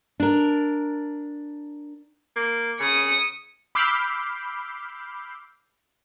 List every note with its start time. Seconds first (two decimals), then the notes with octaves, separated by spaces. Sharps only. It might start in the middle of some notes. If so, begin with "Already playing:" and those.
0.20 D4 A#4
2.36 A#3
2.80 C#3 D#6 C#7
3.75 B5 D6 E6 F6 G6 C7